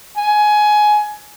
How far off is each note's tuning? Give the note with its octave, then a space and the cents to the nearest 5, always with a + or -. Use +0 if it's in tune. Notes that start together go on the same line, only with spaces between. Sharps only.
G#5 +15